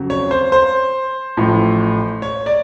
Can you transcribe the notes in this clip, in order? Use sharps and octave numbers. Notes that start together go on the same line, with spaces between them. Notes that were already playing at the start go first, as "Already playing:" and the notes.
Already playing: F2 C#3 F#3
C#5
C5
C5
A1 A2 F3
C#5
D5